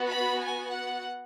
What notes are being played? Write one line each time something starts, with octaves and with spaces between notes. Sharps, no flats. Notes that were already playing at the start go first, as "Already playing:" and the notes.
Already playing: B3 F#4
B5
G#5
F#5